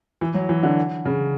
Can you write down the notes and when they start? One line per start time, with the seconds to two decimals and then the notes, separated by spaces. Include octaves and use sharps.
0.21 E3
0.34 F#3
0.49 E3
0.63 D3
1.05 C#3